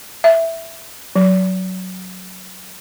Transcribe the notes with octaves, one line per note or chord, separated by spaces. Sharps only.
E5
F#3